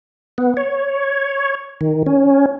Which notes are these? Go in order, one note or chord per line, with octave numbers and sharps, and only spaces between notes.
B3
C#5
D#3
C#4